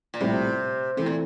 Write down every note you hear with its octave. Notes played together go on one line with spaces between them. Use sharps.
A#2
A#1 A2 C3 G3 C4 E4
C3 E3 A3 C4
A#2